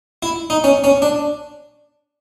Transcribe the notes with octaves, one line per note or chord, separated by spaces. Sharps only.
E4
D#4
C#4
C#4
D4